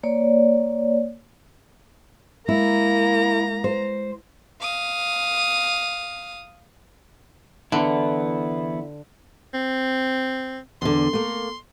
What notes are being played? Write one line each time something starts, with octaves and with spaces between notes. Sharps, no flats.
A#3 C#5 D5
G#3 A#3 E4 A#5
C5
F5 D#6
D3 E3 B3 E4
C4
E2 D3 C6
A3 A#3